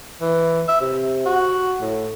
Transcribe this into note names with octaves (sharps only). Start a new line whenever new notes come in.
E3
E5
C3
F#4
A2